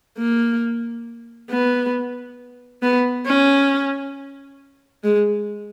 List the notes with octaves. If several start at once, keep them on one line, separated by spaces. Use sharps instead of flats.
A#3
B3
B3
C#4
G#3